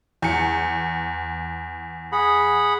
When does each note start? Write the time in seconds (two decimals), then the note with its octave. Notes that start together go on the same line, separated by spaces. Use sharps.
0.22 E2 C#7
2.12 G#4 F#5 B5